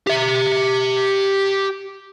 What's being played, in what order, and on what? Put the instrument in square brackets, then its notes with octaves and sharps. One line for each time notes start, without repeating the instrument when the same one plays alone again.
[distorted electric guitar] G4 E5